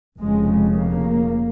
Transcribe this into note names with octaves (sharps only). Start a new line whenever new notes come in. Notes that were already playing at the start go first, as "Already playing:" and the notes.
F1 F2 C#3 G#3
A#3